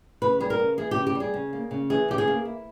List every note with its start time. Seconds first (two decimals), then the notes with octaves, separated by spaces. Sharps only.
0.22 C#3 B4
0.40 G3 G#4
0.50 A#4
0.59 C#3
0.78 E3 G#4
0.91 C#3 G4
1.07 G4
1.15 G3 G#4
1.34 C#3
1.53 A#3
1.71 C#3
1.90 E3 G#4
2.08 C#3 G4
2.18 G#4
2.28 A#3
2.45 E4